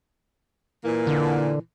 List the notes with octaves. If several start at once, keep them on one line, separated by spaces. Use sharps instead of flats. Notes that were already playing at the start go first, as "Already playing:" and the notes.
A#2 E3 A#3
D3